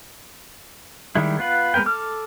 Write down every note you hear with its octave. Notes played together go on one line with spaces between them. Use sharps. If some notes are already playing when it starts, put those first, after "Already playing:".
D#3 G3 G#3 E4
B3 F4 B4
G#3 B3 A#4 B4 G5
A4 D6 F6